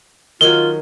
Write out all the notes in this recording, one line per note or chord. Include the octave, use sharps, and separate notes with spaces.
D#3 F#3 F4 G7